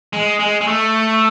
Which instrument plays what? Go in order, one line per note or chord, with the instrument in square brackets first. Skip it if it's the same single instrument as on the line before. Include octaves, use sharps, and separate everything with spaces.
[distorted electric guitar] G#3
G#3
G#3
A3